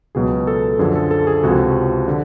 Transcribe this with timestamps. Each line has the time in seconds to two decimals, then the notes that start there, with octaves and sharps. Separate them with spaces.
0.15 C#2 B2 F#3 G#4
0.47 A4
0.79 F#2 D3 F3 G#4
0.96 A4
1.11 A4
1.27 G#4
1.43 C#2 C3 F3 F#4
2.08 D3